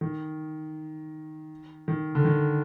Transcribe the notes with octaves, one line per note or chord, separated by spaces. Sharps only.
D#3
D#3
D3
D#3